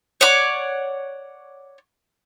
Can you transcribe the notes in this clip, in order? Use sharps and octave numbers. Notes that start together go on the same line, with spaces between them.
C#5 D5 F#5 D6